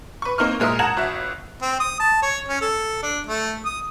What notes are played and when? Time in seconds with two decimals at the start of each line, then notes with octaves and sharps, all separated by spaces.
0.22 B4 C#6
0.38 A#3 C4 D#4 C#6 F6
0.60 A#2 G#3 A#4 E5 D#6
0.79 F#5 A5 A#5 G#6 E7 F#7
0.97 G1 F#4 E5
1.62 C4
1.80 D#6
1.99 A5
2.22 C#5
2.48 C#4
2.61 A4
3.03 D4
3.27 A3
3.65 D#6